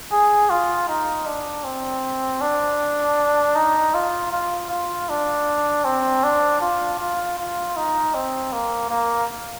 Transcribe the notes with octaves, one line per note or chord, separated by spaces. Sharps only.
G#4
F4
D#4
D4
C4
D4
D#4
F4
F4
F4
D4
C4
D4
F4
F4
F4
D#4
C4
A#3
A#3